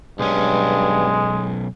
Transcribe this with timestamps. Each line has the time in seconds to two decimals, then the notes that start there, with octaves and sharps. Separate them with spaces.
0.19 B1 G2 G#3 C#4